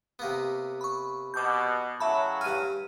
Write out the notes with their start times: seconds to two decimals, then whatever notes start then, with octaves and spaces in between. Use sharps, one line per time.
0.19 C3 A#3 B3
0.81 B5 C#6
1.34 B2 D6 G6
2.00 A2 C#3 F#3 E5 A5 B5
2.41 G2 G#5 F6 D#7